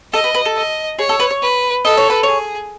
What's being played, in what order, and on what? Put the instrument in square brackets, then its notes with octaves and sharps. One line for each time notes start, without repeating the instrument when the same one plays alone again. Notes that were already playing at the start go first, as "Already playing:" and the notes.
[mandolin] A4 [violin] D#5
[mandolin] B4
B4
A4
[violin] D#5
[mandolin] G#4 [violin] C#5
[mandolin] A4
B4
C#5
[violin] B4
[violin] A4 [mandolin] D#5
[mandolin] C#5
B4
[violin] G#4 [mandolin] C#5